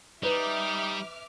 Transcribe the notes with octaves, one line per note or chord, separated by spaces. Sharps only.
G3 D#4 B4 E5 D6 F6